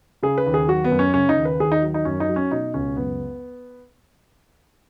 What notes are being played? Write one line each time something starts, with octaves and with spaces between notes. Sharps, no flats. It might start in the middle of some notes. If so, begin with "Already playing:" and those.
C#3 G#4
B4
D#2
G#4
F#3 F#4
B3
F#2
C#4
C#3 C#4
D#4
D#2
B4
D#2 G#4
D#4
F#3
D#4
F#2 C#4
D#4
F#3
C#4
B2 D#4
C#2 C#4
F#2 B3